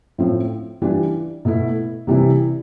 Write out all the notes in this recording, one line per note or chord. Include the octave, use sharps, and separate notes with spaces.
A2 F3 C4 F4
E3 G3 D4 F4
B2 A3 E4
C3 E3 G3 C4 E4